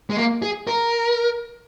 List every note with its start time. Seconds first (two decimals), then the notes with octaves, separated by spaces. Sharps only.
0.10 G#3
0.17 A#3
0.42 G#4
0.67 A#4